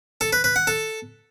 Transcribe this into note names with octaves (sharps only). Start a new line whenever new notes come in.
A4
B4
B4
F#5
A4